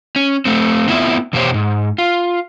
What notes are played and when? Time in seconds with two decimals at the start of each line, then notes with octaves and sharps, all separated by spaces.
0.16 C#4
0.45 A3 C4
0.88 A3 B3 C4 E4 F4 E5
1.33 E2 B2 A#3 G4 C5 C#5
1.54 G#2
1.98 F4